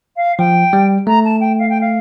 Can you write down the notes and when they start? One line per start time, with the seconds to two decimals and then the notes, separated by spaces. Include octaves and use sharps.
0.16 F5
0.39 F3 G5
0.73 G3
1.07 A3 A#5
1.25 A5
1.41 G5
1.59 F5
1.69 G5
1.81 F5